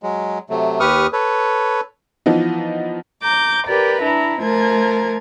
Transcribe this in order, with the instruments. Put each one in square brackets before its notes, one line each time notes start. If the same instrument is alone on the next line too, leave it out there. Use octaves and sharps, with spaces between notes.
[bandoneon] F#3 G#3
C3 F#3 A3
D#2 G4 B4 C#6 D#6 F6
A4 B4 C#5
[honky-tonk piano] E3 F3 B3 D#4
[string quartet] A#5 D6 G6
G4 A#4 B4 D5
D4 E4 A#5
F3 A3 A#4 G#6